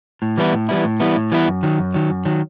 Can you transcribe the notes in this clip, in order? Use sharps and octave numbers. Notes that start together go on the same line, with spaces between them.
A2
E3 G3 B3 E4
A2
E3 G3 B3 E4
A2
E3 G3 B3 E4
A2
E3 G3 B3 E4
F#2
D#3 F#3
F#2
D#3 F#3
F#2
D#3 F#3